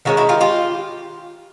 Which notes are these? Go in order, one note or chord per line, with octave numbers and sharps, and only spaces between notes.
D#3 G#3 C#4 E4 F#4
E4 F#4
F4 G4
F4 G4